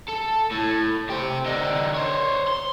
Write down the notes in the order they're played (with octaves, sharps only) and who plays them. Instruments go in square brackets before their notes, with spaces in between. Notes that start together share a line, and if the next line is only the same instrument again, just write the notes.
[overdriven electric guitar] A4
A2
G4 C5
D3 D#4
C5 C#5
C6